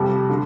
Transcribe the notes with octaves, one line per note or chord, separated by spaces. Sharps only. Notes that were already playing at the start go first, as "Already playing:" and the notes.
Already playing: F2 C3 G3
D3